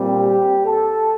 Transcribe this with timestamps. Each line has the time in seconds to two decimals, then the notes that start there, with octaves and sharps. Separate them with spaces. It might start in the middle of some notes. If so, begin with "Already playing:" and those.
Already playing: A#2 G3 C4
0.20 G4
0.65 A4